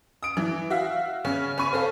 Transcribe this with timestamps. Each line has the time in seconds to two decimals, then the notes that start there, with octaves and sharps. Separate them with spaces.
0.23 D#6 D7
0.37 E3
0.70 F#4 E5 F5
1.24 C#3 C#4
1.58 C#4 B5 C#6 D#7
1.73 C4 C#4 A4 F5